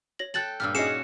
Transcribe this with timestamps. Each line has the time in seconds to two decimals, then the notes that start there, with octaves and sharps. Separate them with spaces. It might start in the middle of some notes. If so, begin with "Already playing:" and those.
0.19 C#5 A#6 F#7
0.34 A4 G5 A5 F#6 A6 F#7
0.60 G2 A#2 G4 E6 F6
0.75 C#4 D#4 F#4 G#4 C7 C#7 E7